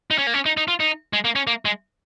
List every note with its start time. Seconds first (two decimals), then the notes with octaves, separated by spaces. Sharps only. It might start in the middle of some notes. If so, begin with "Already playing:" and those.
0.11 D#4
0.18 C#4
0.27 A#3
0.34 C#4
0.46 D#4
0.57 D#4
0.68 F4
0.80 D#4
1.13 G#3
1.25 A#3
1.36 C#4
1.47 A#3
1.65 G#3